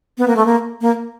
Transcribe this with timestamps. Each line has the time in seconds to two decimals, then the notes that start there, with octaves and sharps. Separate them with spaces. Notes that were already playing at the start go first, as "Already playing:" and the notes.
0.18 B3
0.28 A#3
0.36 A3
0.46 A#3
0.81 A#3